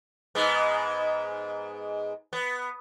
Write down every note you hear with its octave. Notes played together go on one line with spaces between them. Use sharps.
G#2 G#3 B3
B3